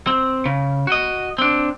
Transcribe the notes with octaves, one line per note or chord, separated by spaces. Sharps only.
C4
C#3
F#4 D#5
C4 D4